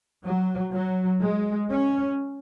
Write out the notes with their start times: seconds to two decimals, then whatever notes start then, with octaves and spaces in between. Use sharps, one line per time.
0.24 F#3
0.73 F#3
1.21 G#3
1.70 C#4